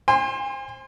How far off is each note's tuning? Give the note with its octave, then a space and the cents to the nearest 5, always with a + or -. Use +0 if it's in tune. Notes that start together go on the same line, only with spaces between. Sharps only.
C5 +25 G#5 -45 C6 +0